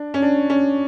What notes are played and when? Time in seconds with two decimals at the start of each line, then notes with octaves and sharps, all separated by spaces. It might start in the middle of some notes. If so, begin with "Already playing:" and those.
Already playing: D4
0.14 C#4
0.22 D4
0.50 C#4